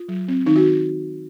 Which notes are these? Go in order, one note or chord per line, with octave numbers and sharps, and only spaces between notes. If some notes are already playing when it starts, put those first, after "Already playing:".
Already playing: F4
F#3
C4
D#3 D#4
F#4